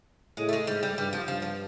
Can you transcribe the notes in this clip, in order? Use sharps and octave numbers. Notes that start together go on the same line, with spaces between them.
A2 G#3
A3
G#3
G#2 G3
G3
G2 G3
F3
G2 F3
F3